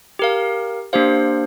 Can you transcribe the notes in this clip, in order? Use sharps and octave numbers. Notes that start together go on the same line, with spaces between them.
G4 A#4 F5
A#3 D4 G4 C5 F5